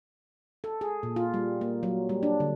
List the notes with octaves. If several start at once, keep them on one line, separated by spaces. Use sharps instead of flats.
A4
G#4
A#2
F4
G3
A#3
F#3
G3
D4
D3